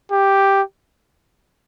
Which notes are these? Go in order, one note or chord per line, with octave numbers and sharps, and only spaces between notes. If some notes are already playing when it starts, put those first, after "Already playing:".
G4